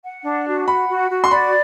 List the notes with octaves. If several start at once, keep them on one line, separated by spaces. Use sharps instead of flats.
F#5
D4
F#4
F#5 B5
F#4
F#4
C6
D5 B5